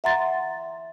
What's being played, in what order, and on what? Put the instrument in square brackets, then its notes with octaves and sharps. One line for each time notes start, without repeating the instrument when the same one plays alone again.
[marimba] E5 F#5 A#5 C6 A6